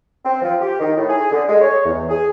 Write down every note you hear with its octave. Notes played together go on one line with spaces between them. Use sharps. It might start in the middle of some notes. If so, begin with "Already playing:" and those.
C4
F3
G4
D#3
A2
G#4
D3
G#3
C#5
E2
G#4